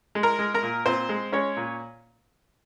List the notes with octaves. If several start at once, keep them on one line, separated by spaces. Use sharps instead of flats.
G#3
A#4 A#5
G#3
A#4 A#5
A#2
A#2 C4 C5
G#3
G#3 C#4 C#5
A#2